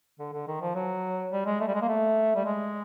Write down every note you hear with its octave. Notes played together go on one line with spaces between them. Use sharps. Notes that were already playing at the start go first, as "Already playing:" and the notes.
D3
D3
D#3
F3
F#3
G3
G#3
A3
G3
G#3
A#3
A3
G3
G#3